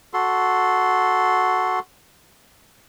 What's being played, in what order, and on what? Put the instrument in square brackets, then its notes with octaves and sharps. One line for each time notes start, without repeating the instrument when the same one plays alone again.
[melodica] F#4 A4 C6